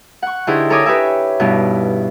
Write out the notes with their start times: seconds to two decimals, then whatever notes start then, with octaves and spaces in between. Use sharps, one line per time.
0.22 F#5 C#6
0.47 D3 D#4 E4 G4 G#4 C5
0.70 A4 A#4 C#5 G#5 D6 D#6
0.85 G4 B4 C#5 E5 G#5
1.40 G2 B2 D#4 E4